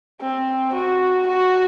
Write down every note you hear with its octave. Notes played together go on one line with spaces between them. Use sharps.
C4
F#4
F#4